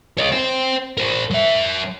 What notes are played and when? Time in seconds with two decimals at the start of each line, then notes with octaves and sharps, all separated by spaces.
0.18 C#5 D#5
0.32 C5 G5
0.97 A#4 C5
1.30 F#3 E5